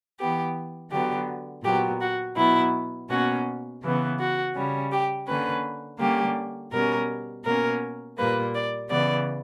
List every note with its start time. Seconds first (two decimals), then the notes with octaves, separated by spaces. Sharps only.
0.19 E3 B3 G4
0.91 D3 F#3 B3 G4
1.63 A#2 F#3 B3 G4
2.00 F#4
2.36 B2 F#3 B3 E4
3.09 B2 A#3 C#4 F#4
3.82 C#3 E3 B3
4.19 F#4
4.54 C#3 G3 C#4
4.91 G4
5.26 D3 A#3 C#4 B4
6.00 D3 G3 A#3 C#4 G4
6.72 B2 G3 C#4 A#4
7.44 B2 A#3 C#4 A#4
8.18 A#2 G3 A#3 B4
8.54 D5
8.90 C#3 E3 B3 D5